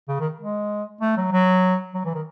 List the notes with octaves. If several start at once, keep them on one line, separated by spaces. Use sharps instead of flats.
C#3
D#3
G#3
A3
F#3
F#3
F#3
E3
D#3